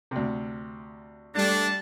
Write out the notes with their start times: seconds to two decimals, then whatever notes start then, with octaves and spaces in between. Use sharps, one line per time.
0.11 D2 C3
1.35 G3 A3 D4 A5